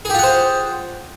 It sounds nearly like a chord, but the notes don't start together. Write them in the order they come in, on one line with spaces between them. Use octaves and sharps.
G#4 G4 F4 F#5 C5